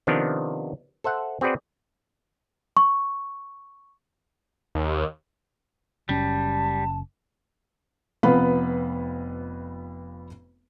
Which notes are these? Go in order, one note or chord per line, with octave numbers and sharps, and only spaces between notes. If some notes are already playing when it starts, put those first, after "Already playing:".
C3 D#3 F3 B3 D4
A4 C5 E5 F#5
C4 F#4 G#4 B4 C5 D5
C#6
D#2
F#1 F#2 G3 C#4 A5
F1 F2 B3 B4 F5 B5